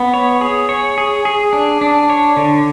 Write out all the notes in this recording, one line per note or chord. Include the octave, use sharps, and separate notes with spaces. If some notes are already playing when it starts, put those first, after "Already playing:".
Already playing: B3
C#5
G#4
C#5
G#4
G#4
D4
D4
C#5
D3